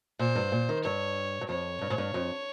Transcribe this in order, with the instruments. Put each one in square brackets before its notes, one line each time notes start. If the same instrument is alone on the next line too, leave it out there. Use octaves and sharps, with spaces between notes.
[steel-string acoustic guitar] A#2 [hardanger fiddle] C5
[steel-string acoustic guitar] G2
A#2
D#3
[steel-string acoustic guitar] G2 [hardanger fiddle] C#5
[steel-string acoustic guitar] G2
[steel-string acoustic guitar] F2 [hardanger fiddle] C#5
[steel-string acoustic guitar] G2
G#2
G2
F2